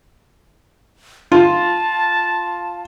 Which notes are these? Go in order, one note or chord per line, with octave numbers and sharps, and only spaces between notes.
F4 A5